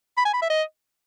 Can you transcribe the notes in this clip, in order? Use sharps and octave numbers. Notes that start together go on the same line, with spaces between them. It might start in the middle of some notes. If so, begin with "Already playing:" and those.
B5
G#5
B5
E5
D#5